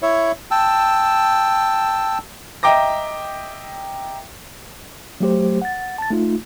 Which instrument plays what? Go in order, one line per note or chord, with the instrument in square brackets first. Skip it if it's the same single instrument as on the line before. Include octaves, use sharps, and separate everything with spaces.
[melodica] E4 C#5 E5
G5 A5 E6
[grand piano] D#5 E5 G5 A#5 D6 A#6
[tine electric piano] F#3 A3 G4 C5
F#5 A6
A5 A6
A3 D#4 F4